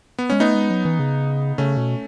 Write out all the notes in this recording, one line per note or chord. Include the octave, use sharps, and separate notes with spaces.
B3
G#3 C#4
A3 B3 D#4
G#3
F#3
E3
C#3
C#3 A3 C#4
B2